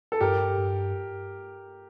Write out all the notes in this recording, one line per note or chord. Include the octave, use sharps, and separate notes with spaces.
A4
G2 G4 A#4
G2